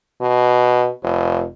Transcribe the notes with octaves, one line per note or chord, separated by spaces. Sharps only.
B2
F1